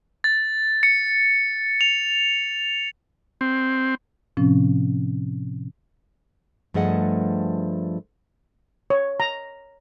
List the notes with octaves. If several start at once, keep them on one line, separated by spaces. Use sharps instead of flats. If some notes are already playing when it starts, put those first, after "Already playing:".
A6
C#7
F7
C4
A2 C3 F3 C4 C#4
G2 F3 A3 G#4 D#5 F#5
C#5
A#5